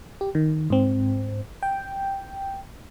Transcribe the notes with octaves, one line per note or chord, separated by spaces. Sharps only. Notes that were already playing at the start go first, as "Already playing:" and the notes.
G4
D#3
G#2 C4
G5